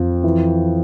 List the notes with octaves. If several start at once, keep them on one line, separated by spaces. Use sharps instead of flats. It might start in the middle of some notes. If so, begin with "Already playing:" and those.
Already playing: F2 F3
E3